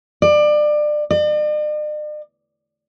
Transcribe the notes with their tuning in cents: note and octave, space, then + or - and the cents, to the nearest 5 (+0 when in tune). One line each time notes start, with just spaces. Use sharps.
D5 +25
D5 +45